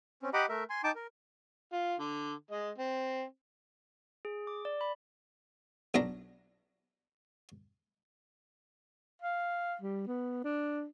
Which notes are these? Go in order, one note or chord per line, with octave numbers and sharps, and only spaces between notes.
C4 C#4
G4 D#5 F#5 A#5 B5 D6
A3 A#4 E5
G#5 C6
D#4 G5 A5 D6
A#4
F4
D3
G#3 D#5
C4
G#4
D6
D5
B5
B1 B2 D4 A#5
F5
G3
B3
D4